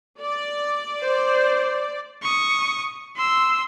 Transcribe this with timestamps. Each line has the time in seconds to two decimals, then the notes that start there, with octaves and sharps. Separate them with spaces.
0.20 D5
1.01 C5
2.22 C#6 D#6
3.16 C6 E6